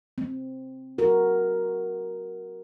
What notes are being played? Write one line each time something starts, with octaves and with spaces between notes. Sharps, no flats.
C4
F#4 A#4